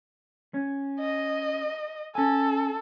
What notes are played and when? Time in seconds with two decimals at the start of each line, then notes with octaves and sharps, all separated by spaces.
0.54 C#4
1.00 D#5
2.15 C#4 A4 G#5